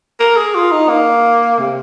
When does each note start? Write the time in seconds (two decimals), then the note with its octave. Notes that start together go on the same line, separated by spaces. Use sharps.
0.20 A#4
0.36 G#4
0.55 F4
0.71 D#4
0.89 A#3
1.59 C3